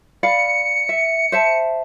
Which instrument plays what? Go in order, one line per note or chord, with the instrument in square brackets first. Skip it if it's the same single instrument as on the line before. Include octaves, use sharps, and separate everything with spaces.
[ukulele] D5 F5 B5 [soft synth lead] C#7
[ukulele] E5
C5 E5 A5